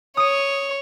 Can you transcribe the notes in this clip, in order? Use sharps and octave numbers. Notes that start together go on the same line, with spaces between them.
C#5 D#6 D#7